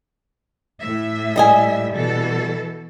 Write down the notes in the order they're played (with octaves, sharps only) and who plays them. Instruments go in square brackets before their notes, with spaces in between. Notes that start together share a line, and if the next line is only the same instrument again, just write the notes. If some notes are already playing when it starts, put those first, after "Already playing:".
[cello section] A2 E5
[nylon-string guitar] G3 D#5 G#5
[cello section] B2 E3 A4